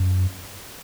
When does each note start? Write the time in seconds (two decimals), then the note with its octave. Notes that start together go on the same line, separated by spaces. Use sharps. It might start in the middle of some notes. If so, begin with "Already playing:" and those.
Already playing: F#2